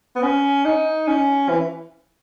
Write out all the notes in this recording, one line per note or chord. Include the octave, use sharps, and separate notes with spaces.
B3
C#4
D#4
C#4
E3